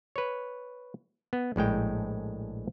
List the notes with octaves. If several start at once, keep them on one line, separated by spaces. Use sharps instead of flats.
B4 C#5
B3
A#1 A2 G#3 G5